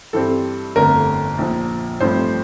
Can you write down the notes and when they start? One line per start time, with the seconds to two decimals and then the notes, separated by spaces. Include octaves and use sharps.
0.13 G2 E3 G3 C4 A4
0.76 G1 F2 D3 A3 A#4
1.38 A#1 A#2 F3
2.00 A1 G2 F3 A3 C4 C5